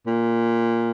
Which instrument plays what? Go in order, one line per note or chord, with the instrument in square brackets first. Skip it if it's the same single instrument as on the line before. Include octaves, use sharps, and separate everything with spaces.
[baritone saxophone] A#2